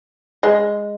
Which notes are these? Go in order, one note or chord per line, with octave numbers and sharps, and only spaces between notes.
G#3